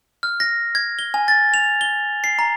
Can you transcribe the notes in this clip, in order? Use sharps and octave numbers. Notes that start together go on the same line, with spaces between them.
F6
A#6
G#6
G7
G#5
A6
F7
G7
C7
A#5